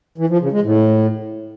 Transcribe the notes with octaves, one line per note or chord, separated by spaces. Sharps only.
E3
F3
C#3
G#3
A2